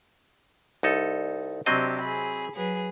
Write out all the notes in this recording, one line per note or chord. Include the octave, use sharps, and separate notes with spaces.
C2 D#4 A4
C3 F#3 C4 D4 G4 D#5
G#4 B5
F#3 G#4 B4